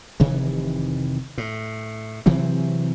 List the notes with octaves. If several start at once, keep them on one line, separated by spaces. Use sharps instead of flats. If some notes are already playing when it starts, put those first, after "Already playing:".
F1 C3 D#3 E3
A2
C3 E3 F#3 C4